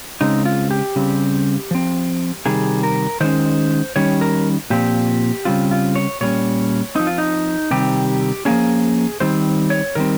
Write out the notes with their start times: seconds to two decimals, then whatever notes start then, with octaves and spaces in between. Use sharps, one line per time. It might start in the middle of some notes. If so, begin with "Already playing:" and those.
0.21 C#3 G#3 C4 D#4
0.45 F4
0.71 G4
0.96 C#3 G3 C4
1.71 F3 C4
2.46 C3 D#3 G3 G#4
2.83 A#4
3.20 D#3 G#3 C#4 C5
3.96 D#3 G3 C#4 C#5
4.21 A#4
4.70 A#2 F3 C4 G4
5.45 C#3 G3 C4 F4
5.71 F4
5.96 C#5
6.21 A#2 G3 C#4 C#5
6.95 F3 C4 D#4
7.07 F4
7.18 D#4
7.71 C3 D#3 G3 C4 G4
8.45 F3 A#3 C#4 G#4
9.20 D#3 G3 C4 C5
9.70 C#5
9.95 D#3 G3 C4 A#4